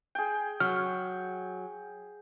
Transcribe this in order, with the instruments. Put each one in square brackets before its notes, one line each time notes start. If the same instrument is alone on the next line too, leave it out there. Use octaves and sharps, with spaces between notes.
[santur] G#4 G5
[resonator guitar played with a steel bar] F#3 [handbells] F6